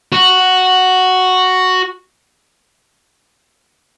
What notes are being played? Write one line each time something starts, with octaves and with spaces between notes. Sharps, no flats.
F#4